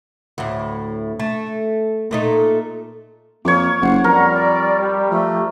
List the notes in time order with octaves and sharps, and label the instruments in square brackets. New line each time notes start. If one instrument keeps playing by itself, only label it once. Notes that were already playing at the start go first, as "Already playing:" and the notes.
[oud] D2 A2
A3
A#2 A3 D#4
[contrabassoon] F2 [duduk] A#3 [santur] C#5 D6
[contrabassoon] F#1 [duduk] C5 [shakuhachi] F#5
[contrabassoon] F2 [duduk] G3 [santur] A#4
[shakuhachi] D5
G4
[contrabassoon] F3 [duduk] A3